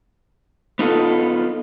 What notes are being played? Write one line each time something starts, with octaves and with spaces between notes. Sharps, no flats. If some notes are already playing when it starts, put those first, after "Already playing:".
B3 D#4 F4 A4